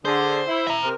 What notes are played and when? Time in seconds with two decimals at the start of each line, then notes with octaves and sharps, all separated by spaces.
0.05 D3 G#4 C5
0.47 E4
0.67 E5 A#5
0.83 C3 C4 A#4